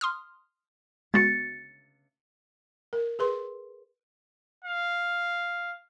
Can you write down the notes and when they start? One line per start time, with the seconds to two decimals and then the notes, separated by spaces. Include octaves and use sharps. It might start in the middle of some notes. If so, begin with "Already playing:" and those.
0.01 C6 D#6 F6
1.14 G#3 B3 F#4 A6 C#7
2.93 A#4
3.19 G#4 B4 C6
4.64 F5